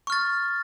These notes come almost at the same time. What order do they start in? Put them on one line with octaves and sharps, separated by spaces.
C#6 F6 A6